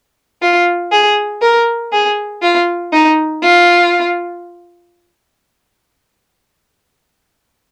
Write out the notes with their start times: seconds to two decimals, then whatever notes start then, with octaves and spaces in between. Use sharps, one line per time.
0.42 F4
0.92 G#4
1.42 A#4
1.93 G#4
2.42 F4
2.93 D#4
3.43 F4